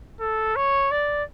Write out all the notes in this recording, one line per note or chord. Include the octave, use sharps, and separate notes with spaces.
A4
C#5
D5